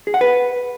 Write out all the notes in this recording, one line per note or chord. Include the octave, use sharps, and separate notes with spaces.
G#4
F#5
B4